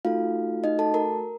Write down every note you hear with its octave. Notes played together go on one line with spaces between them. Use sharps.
A3 D#4 F4 F#4 A4 F5
D#4 D#5
A4 A5
A#4 A#5